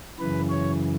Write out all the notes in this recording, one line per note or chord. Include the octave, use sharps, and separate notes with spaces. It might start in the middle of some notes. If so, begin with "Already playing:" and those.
F#2 C#3 E3 B4
C#5